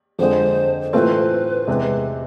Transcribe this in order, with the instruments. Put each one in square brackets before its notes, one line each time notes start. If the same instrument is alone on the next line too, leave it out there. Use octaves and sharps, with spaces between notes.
[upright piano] F2 D3 G#3 [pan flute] C5
[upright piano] A2 E3 A3 C4 F4 [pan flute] B4
[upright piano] E2 C3 G#3